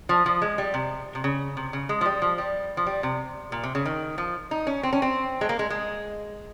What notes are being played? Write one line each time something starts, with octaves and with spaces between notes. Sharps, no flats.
F3
F3
G#3
G3
C3
C3
C#3
C3
C#3
G#3
F3
G3
F3
G3
F3
G3
C3
A#2
C3
C#3
D#3
F3
D#4
C#4
C4
C#4
C4
G#3
A#3
G#3
G#3